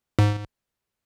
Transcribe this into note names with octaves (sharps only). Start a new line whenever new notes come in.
G#2